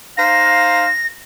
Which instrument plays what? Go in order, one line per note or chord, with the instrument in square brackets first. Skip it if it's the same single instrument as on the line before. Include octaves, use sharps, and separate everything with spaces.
[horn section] D#4 C5 F5 [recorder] A#6